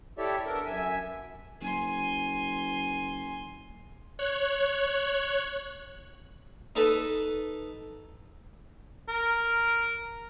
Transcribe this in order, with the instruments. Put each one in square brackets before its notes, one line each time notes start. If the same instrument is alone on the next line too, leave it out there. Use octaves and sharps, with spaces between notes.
[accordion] E4 G4 A4 C#5 D5 E5
B3 D4 A4 A#4
F#2 E5 G#5
[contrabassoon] F#1 [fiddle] G#5 C6
[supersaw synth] C#5 F#6
[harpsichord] D#4 A4 B4
[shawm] A#4